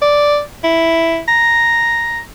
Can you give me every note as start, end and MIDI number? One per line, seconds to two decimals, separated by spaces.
0.02 0.40 74
0.64 1.19 64
1.28 2.20 82